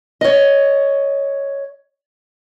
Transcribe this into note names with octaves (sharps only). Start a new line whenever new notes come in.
C#5 D#5